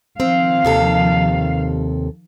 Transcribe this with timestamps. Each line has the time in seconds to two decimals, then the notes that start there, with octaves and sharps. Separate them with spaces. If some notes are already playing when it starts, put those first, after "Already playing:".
0.20 D#3 F3 C4 F5
0.65 D#2 C3 A4